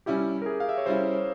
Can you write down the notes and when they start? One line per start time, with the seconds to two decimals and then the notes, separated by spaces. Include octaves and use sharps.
0.06 G3 C#4 E4 G4
0.42 A#4
0.46 G#4
0.60 F5
0.69 E5
0.78 C#5
0.86 G3 C#4 E4 C5